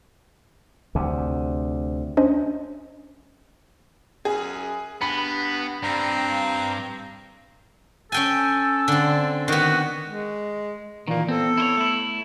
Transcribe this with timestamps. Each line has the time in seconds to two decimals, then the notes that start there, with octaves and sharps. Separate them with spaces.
0.95 D2 C3
2.17 C#4 D4 C5 D#5
4.25 F#2 G#4
5.02 G2 B3 B5
5.83 G2 C4 A#5
8.12 C#4 A4 G5 G#5
8.88 D3 C4
9.48 D#3 B3 F#4
10.07 G#3
11.08 A#2 D#3 E3 A#3
11.29 B3 C4 A4
11.58 E4 C5 C#5
11.77 A3 E4